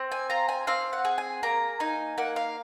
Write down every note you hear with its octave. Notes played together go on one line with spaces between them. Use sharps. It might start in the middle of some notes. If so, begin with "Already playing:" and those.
Already playing: C4
G#5
F4 A#5
G#5
C4 F5
F#5
G#4
G#5
A#3 A#5
D#4 G#5
A#3 F#5
F5